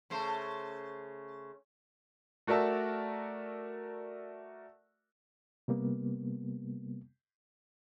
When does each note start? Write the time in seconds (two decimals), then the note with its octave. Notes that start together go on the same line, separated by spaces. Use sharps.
0.10 C#3 A3 C5
2.47 A3 F#4 A#4 D5 E5 A5
5.68 C3 G3 A#3 B3